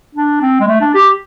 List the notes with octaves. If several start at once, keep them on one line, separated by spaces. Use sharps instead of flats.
D4
C4
G#3
A3
D4
G4